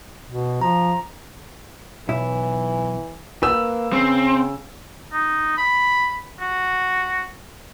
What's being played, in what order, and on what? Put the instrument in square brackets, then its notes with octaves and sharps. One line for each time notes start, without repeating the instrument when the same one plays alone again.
[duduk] B2
[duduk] F3 [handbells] A#5
[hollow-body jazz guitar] B1 E4 [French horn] E3
[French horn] A#3 [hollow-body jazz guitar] B4 [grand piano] E6
[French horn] C#3 [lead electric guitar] C4
[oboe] D#4
B5
F#4